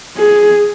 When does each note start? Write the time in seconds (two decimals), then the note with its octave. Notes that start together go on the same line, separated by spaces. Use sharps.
0.17 G#4